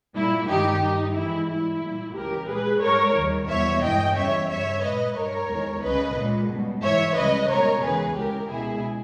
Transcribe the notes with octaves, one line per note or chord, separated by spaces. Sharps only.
A#2 G3 E4
G2 D#3 G#3 D#4 G4
G2 G3 D#4
G#2 E3 G#3 E4
G#2 G3 E4
A#2 G3
C#2 C#3 E3 G4 A#4
A#2 G#3 G#4 B4
G#2 G3 A#4 C#5
D#2 D#3 G3
E2 B2 G3 C#5 E5
G2 E3 G#3 D#5 G5
E2 C#3 G3 C#5 E5
G2 G3 C#5 E5
A#2 G#3 B4 D#5
G2 G3 A#4 C#5
E2 D#3 G#3
C#2 C#3 G3 B4 D#5
A#2 G#3
C#2 B2 G3
G#2 E3 G3 C#5 E5
C#2 C#3 G3 B4 D#5
C#2 B2 G3 A#4 C#5
E2 C#3 E3 G#3 G#4 B4
C#2 C#3 G#3 G4 A#4
C#2 B2 G#3 E4 G#4